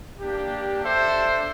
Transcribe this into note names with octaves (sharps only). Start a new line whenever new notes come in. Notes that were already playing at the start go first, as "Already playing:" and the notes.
A#3 D4 G4
D4 A4 C5 E5